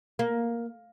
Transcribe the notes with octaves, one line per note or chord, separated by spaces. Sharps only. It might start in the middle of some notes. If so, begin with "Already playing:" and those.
A#3